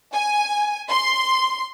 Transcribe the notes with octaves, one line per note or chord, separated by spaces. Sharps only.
G#5
C6